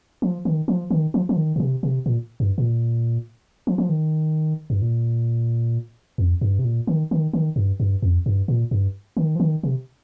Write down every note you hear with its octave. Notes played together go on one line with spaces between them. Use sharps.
F3
D#3
F3
D#3
F3
F3
D#3
A#2
C3
C3
A#2
G2
A#2
F3
F3
D#3
G2
A#2
F2
G2
C3
A#2
D#3
D#3
D#3
G2
G2
F2
G2
A#2
G2
D#3
F3
D#3
C3